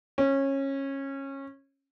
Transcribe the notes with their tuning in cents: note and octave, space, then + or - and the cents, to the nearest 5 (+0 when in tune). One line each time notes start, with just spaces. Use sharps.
C#4 -20